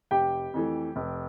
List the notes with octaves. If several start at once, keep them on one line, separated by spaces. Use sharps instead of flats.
F1 G4 G5
F2 E3 A3
F1